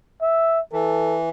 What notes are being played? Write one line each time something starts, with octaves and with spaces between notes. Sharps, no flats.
E5
E3 A4